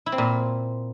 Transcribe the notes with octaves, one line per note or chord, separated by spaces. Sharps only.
E4
C4
A#2